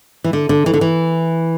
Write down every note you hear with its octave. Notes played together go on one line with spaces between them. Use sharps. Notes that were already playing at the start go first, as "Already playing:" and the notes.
E3
D3
D3
E3
D3
E3